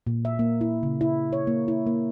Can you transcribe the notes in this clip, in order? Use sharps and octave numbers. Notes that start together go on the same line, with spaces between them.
A#2
E5
A#3
E4
C#3
E4
C#5
A#3
E4
A#3